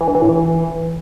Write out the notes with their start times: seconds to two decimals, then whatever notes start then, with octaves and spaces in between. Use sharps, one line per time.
0.01 E3
0.08 G2
0.15 E3
0.22 A2
0.29 E3